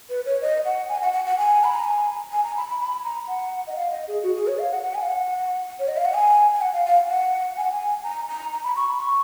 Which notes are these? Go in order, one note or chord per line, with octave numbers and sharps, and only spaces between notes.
B4
C#5
D#5
F#5
G#5
F#5
F#5
F#5
G#5
B5
A#5
G#5
G#5
A#5
B5
B5
B5
A#5
F#5
D#5
F5
D#5
G#4
F#4
G#4
C#5
F5
F#5
F#5
G#5
F5
F#5
C#5
D#5
F5
F#5
G#5
G#5
F#5
F5
F5
F#5
G#5
F#5
G#5
A#5
A#5
A#5
B5
C#6
B5
C#6